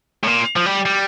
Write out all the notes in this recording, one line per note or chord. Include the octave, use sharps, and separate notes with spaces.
A2
A#2
F3
G3
G3